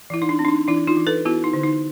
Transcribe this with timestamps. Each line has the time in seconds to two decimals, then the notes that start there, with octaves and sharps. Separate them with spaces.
0.10 E3 E4
0.22 D#4
0.29 D4
0.39 C4
0.45 D4
0.48 D#4
0.68 E3 D4 E4
0.87 D#4 F4
0.97 E3
1.07 A4 B4
1.25 B3 E4 F#4
1.44 D#4
1.53 D3
1.63 D#4